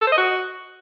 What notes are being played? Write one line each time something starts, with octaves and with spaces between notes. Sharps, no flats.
A4
C5
D#5
F#4